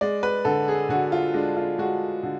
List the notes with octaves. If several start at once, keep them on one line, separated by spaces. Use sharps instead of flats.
G#3 D5
B4
D3 A4
G#4
D3 F#4
F4
G#3 D4
F4
G#3 F#4
D3